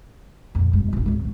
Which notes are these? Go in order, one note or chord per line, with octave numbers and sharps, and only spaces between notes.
F2 A#2
E1 G2
D#1 D#4
G#1 D2
G#1 C#2